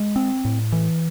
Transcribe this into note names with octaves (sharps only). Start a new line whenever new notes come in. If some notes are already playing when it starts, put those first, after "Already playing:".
Already playing: G#3
C4
A2
E3